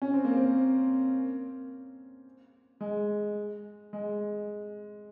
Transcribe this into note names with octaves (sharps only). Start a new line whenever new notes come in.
C#4
C4
A#3
C4
G#3
G#3